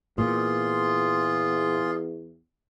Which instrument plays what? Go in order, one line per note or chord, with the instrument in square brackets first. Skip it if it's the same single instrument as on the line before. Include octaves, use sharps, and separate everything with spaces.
[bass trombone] E2 [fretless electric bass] A#2 [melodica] F4 G#4 C6